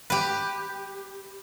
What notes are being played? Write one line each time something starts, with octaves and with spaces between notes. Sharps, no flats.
G4 B4